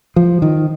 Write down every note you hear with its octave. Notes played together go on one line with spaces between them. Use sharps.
F3
D#3